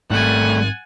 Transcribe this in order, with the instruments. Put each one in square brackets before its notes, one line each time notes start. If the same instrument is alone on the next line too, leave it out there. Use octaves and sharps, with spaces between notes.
[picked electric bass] G#2 C4 [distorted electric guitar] G3 A3 [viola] F#5 G#5